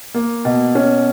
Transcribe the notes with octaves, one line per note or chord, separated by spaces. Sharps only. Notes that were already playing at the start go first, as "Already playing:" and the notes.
A#3
B2
C#4